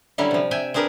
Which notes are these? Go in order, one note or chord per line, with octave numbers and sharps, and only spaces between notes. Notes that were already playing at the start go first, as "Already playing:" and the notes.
D3 F#3 G3 C#4 E4
C3 F3
C3 E5 G5 G#5
C4 D4 G#4 A#4 B4